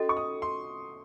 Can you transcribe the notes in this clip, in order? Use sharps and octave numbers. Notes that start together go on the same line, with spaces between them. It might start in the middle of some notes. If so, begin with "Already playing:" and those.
Already playing: C#4 F#4 A4 D#5
C#6
D#6
C6